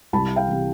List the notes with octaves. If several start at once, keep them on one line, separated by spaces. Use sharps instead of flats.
C2 A5 B5
F5 G5
C3 E3